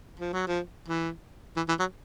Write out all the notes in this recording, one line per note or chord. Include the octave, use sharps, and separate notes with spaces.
F3
F#3
F3
E3
E3
E3
F#3